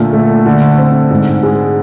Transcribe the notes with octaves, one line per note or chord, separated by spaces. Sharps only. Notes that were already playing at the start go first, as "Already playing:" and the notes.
Already playing: A#2 D3 A3
A3
D3
C4
G#2
G#3